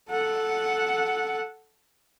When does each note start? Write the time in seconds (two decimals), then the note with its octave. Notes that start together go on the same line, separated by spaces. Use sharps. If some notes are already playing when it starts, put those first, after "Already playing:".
0.11 A4 F#5